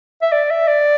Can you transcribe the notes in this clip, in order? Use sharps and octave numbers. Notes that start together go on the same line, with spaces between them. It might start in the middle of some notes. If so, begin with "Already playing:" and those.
E5
D5
E5
D5